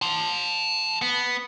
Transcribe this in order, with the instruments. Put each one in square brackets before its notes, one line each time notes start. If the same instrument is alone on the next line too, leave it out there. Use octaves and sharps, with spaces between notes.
[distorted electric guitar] A5 C6
B3